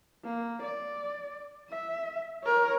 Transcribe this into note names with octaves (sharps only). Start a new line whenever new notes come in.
A#3
D5
E5
A#4 C#5